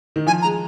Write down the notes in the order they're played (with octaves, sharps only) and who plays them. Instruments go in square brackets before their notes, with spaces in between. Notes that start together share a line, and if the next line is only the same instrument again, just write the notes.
[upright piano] D#3
[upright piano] F3 [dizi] G#5
[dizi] A#5
[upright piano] G#3